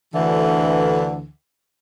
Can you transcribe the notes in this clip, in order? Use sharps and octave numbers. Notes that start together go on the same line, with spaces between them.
D2 D3 E3